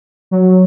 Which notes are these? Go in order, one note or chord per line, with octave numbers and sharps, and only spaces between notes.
F#3